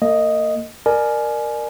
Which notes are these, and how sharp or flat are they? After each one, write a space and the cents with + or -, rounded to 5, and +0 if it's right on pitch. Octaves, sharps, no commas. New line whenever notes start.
A#3 -35 D#5 +0
A#4 +0 D5 +30 G#5 +25